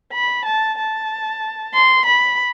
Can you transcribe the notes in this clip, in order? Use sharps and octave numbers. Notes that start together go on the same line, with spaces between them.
B5
A5
A5
C6
B5